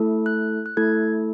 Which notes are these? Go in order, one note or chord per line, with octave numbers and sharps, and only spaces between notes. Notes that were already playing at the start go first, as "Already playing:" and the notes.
Already playing: A3 E4 A4
F#6
F#6
A3 E4 A4 G#6